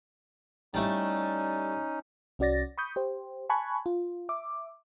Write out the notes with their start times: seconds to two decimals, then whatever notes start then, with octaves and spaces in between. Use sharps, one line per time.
0.74 G3 A3 C#4 D#4 E4
2.39 C2 C#4 F#4 D5 A6 A#6
2.78 B5 C#6 D#6 G6
2.96 G4 C5
3.50 G#5 A5 B5 C#6 F#6 G#6
3.86 F4
4.29 E5 D6